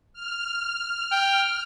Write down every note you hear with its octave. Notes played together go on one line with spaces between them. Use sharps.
F6
G5